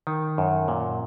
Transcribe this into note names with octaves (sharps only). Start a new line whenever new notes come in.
D#3
F#2
A#2